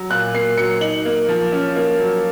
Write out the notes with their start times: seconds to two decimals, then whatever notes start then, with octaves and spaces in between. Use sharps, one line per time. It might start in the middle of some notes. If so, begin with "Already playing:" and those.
Already playing: F#3
0.10 A#2 F#6
0.34 A#3 C7
0.58 F#3 C#7
0.81 D#4 F#7
1.05 A#3
1.29 F3
1.52 C#4
1.76 A#3
2.00 F#3